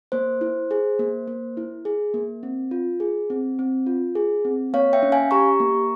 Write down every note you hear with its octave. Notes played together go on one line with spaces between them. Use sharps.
A#3 C5
E4
G#4
A#3
A#3
E4
G#4
A#3
C4
F4
G#4
C4
C4
F4
G#4
C4
A#3 C#5 F5
E5 G5
C#4
F5 G#5
G4 A#5 C#6
A#3